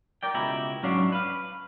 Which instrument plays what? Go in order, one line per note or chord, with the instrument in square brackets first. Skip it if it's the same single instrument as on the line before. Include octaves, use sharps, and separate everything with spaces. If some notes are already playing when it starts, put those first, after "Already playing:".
[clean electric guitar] A#4 D5 G5
C#2 B2 E4 G4 A#5
G#2 F#3 C#4 D4 F5
B4 F5